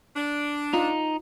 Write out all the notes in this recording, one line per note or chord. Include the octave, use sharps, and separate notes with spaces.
D4
D#4 F4